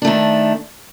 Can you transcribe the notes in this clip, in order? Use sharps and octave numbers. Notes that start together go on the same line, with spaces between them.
D#3 A3 D4